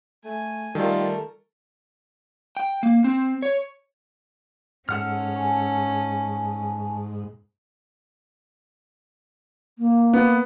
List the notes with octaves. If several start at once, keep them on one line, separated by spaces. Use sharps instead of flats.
A3 G#5
D#3 G3 A3 F4 A4 A#4
G5
A#3
C4
C#5
G#2 C#4 A4 F#5 F6
G#5 A5 C#6
A#3
B3